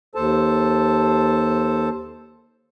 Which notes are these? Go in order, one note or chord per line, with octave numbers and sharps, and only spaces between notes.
D#2 A4 C5 A5